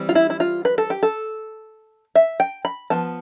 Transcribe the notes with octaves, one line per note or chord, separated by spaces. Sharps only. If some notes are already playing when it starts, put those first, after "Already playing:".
Already playing: E3 G3 C4
F4
E4
E4
F4
B4
A4
G4
A4
E5
G5
B5
F3 B3 A5